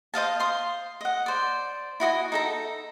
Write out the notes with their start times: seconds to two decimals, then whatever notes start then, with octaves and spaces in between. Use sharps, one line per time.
0.14 C5 D#5 F5 A5
0.39 F5 C6 D#6
1.01 D#5 F#5
1.26 C5 D5
2.00 E4 F#4 D#5 G#5
2.32 D#4 A4 A#5